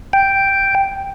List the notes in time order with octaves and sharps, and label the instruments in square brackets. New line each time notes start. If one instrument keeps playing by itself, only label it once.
[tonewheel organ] G5